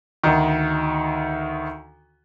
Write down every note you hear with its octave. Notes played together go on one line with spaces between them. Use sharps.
D2 D#3